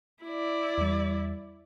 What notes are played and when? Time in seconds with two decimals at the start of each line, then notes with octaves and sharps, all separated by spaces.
0.24 E4 D5
0.78 E2 G3